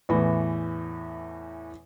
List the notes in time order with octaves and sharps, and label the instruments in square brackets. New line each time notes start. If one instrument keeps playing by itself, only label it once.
[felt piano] E2 A2 E3